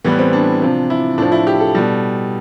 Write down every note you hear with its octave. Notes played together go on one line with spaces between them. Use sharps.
A2 E3 G3 B3
C4
D4
C3 F3
E4
A2 F3 D4
E4
G4
A4
B2 G3